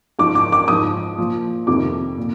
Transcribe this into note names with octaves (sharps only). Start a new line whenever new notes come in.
G#2 F3 D6
D6
D6
G#2 F3 D#6
A#2 F3
F2 C3 D#3 D6
A#2